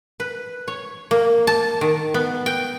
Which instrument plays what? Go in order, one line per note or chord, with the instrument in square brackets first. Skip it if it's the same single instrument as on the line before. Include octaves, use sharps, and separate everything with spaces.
[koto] B4
C#5
A#3
A5
D#3
B3
G5